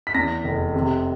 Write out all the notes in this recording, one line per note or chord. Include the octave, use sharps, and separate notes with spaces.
B6
E2 A#6
F1
C3